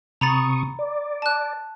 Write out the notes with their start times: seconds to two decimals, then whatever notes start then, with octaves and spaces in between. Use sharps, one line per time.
0.21 C3 A#5 B5 C#6 D#6 A6
0.79 D5
1.22 A5 F#6